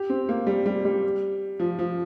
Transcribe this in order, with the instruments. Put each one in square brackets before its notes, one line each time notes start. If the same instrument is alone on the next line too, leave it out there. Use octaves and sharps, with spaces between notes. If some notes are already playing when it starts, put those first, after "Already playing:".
Already playing: [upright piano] G4
C4
A#3
G3
G3
G3
F3
F3